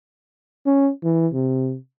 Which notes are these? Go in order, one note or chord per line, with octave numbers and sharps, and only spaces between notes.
C#4
E3
C3